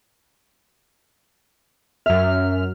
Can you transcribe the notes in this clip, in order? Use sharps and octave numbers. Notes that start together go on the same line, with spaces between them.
F#2 E5 F6